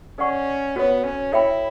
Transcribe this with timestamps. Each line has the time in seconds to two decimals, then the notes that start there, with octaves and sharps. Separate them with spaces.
0.18 C#4 A4 D5 F#5 C#6
0.76 B3 F#4 A4 C#5
1.04 C#4
1.33 E4 A4 C#5 E5 G5 B5